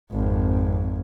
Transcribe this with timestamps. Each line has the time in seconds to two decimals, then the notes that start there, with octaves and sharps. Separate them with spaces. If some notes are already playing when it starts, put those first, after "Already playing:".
0.11 G#1 F2